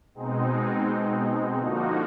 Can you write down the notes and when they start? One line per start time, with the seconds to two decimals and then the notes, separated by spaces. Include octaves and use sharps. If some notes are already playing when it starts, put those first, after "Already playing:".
0.15 B2 G#3 C4 D#4
1.58 D3 F3 A#3 D#4 F#4